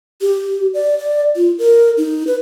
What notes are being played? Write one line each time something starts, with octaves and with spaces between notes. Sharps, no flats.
G4
D5
D5
F4
A#4
D#4
B4